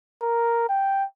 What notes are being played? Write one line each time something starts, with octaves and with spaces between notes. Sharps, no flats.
A#4
G5